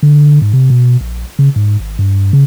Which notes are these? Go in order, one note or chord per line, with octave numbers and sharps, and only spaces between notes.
D3
G#2
C3
B2
A#1
C#3
G#2
G#1
G2
C#3